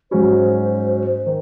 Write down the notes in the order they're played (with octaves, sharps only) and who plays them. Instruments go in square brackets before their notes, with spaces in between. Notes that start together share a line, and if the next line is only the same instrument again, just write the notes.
[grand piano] G#2 F#3 C#4 F#4 [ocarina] C5
[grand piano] D#3